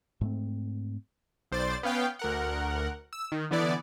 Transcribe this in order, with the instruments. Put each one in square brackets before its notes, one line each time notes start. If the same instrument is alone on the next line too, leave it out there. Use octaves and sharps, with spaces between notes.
[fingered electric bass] G#2 A3 C4
[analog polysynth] B1 C5 D5 A6
B3 C#4 F5 G5
D2 A#4 F#5
E6
D#3
D3 E3 B3 E4 D5